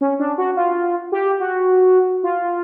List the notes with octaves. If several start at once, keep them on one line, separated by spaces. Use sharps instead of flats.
C#4
D4
F#4
F4
G4
F#4
F4